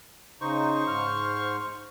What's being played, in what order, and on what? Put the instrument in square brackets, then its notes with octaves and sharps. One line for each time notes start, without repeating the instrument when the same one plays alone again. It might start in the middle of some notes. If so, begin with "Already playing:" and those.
[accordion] C#3 D#4 [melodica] C5 C#6
[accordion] G#2 F6